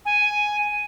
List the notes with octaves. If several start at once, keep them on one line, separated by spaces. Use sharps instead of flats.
G#5